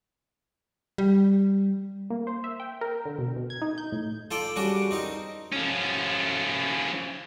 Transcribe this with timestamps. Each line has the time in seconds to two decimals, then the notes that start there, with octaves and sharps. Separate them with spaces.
0.98 G3
2.10 A#3
2.27 C5
2.44 E5
2.60 G5
2.81 A#4
3.06 D3
3.19 B2
3.36 B2
3.50 G#6
3.62 D#4
3.78 G6
3.92 A2
4.31 F4 A4 D5 G5
4.56 C#3 G3 D4 F#4 C#6 D6
4.91 C4 D#4 A#4
5.52 F3 C#4